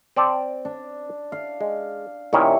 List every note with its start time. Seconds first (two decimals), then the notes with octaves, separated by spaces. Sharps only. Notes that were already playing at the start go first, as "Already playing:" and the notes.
0.16 C4 D5 A5
0.65 D4
1.32 F5
1.61 G#3
2.33 A#2 D#3 C#4 E4 G4 C#5